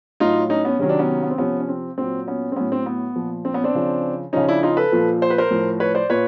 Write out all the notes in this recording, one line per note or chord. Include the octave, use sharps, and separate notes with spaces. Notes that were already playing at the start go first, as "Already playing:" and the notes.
A2 F#3 D#4 F4
C#4 D#4
B3 C#4
C3 D#3 F#3 C#4
D4
B3 C#4
B3
C4
C3 F3 B3 C#4
C#4
C4
A#2 F#3 C4
B3 C#4
C4
A2 F#3 B3 C#4
C4
B3
A#2 F3
C4
B3 C#4
C4 D4
C#3 F3
C#3 F3 C#4 D#4
D4 E4
D#4 F4
A4 B4
A#2 F3
C5
B4
A#4 C5
A2 F3
B4 C#5
C5 D5
A#2 B4 C#5